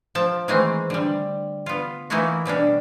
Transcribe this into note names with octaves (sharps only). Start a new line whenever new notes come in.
F3 G5 A5
D#3 E3 G#3 A3 C4
D3 G3
B3 F4
E3 A3 A#3 D#4 E4 F#4
B2 G3 C#4 D4